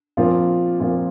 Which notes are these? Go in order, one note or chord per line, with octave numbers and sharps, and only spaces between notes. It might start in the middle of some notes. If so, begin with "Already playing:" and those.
A#2 F3 C4 F4 A#4
A#2 F3 C4 F4 A#4